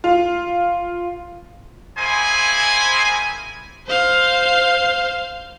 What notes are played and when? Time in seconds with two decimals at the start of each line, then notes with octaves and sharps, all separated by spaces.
0.04 F4
1.97 A#3 C4 E4 G#4 C5 G#5
3.87 C5 F5